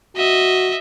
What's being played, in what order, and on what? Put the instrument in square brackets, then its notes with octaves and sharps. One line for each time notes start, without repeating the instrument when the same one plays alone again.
[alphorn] F#4 [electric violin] D#5 E5